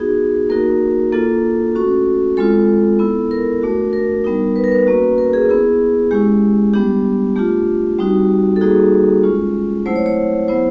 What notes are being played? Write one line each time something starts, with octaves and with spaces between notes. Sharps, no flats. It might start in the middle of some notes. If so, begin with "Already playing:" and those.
Already playing: B3 D#4 F#4 G#4
A#3 D#4 F#4 A#4
A#3 D4 F4 A4
A3 C#4 F#4
G#3 C4 F4 A4
B3 E4
A#4
A3 D4 F#4
A#4
G3 B3 D#4
B4
A#4
B4
A#3 C#4 F#4
A#4
G#4
B3 E4 G#4
G#3 C#4 E4 G4
G3 B3 D4 G4
A3 D4 F4 G4
G3 C4 D#4 F#4
A4
G3 A#3 D#4 F#4 G#4
G#3 C#4 F4
F#3 A3 C4 E4 C5
C#5
C#5
F#3 B3 E4 C5